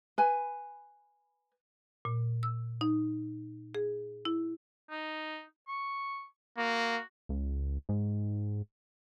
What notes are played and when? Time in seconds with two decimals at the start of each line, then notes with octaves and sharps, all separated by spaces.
0.18 B4 G#5
2.05 A#2
2.43 E6
2.81 D#4
3.75 G#4
4.25 E4
4.90 D#4
5.68 C#6
6.57 A#3 F#4
7.29 C#2
7.89 G#2